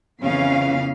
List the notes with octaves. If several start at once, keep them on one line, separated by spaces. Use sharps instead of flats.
F2 C#3 E3 B3 C#4 F5